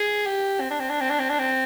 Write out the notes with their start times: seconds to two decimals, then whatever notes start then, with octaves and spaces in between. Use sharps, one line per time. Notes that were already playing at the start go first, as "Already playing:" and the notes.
Already playing: G#4
0.26 G4
0.60 C4
0.70 D4
0.80 C4
0.89 D4
1.00 C4
1.10 D4
1.19 C4
1.29 D4
1.39 C4